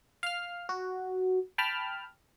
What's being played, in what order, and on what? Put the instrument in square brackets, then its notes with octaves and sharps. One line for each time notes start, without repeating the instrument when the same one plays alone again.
[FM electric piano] F5 F6
F#4
G5 A5 B5 F6